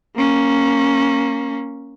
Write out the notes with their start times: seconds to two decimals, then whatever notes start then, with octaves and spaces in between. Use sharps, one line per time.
0.16 A#3 C#4